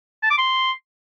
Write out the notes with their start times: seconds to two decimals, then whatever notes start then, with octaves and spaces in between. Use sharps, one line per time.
0.23 A5
0.30 D6
0.38 C6